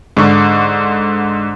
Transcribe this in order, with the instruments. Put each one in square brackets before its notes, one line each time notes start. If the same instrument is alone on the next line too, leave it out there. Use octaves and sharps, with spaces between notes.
[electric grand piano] G#2 D3 C#6